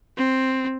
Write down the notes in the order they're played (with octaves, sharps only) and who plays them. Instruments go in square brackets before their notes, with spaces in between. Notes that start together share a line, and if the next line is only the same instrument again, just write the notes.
[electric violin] C4